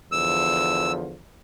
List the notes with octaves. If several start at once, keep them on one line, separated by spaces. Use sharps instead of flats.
E2 D3 F3 E6